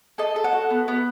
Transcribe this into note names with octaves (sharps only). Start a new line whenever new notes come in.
A4 D#5
A4
F#5
F#4
B3
B3